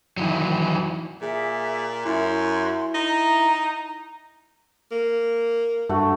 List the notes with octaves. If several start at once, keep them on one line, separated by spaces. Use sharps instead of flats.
D#3 E3 F#3
A#2 G#4 E5
F#2 E4 C6
D#4 A#5
A#3
G2 A3 F#4